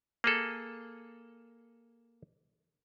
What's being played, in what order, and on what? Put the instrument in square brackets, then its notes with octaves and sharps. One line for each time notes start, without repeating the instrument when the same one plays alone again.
[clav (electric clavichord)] A#3 G#4 A4